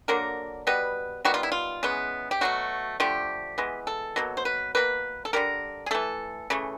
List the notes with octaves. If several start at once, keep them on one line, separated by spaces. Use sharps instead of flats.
D3 F#3 A#3 A#4
B2 G3 B3 B4
D#3 G3 B3 F#4
F4
E4
F4
C#3 E3 G#3 B3
G4
B2 F#3 A3 F#4
D3 F3 A3 G4
E3 G#3 B3
A4
B2 F#3 A#3
C5
B4
B2 G3 A#3 B4
A4
D3 G3 A#3 A#4
G#4
E3 A3 A4
C#3 E3 A3